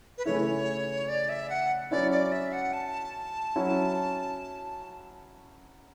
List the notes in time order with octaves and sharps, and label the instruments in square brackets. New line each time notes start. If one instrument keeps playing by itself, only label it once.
[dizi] B4
[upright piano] C#3 E3 A3 E4 [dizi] C#5
[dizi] D5
E5
F#5
[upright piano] F#3 C#4 E4 [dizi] D5
[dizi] D5
E5
F#5
A5
[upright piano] F#3 C#4 E4